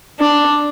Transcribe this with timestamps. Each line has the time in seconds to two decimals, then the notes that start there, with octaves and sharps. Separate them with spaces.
0.19 D4